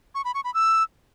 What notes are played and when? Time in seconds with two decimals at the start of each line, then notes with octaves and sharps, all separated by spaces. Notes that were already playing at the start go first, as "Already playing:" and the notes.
0.15 C#6
0.25 B5
0.34 C#6
0.44 B5
0.54 E6